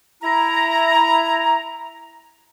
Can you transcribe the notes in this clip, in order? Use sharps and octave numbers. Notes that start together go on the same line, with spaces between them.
E4 A#5